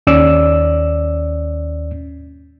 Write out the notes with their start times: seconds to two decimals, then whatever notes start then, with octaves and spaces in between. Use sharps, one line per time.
0.07 D#2 C#4 D5 E6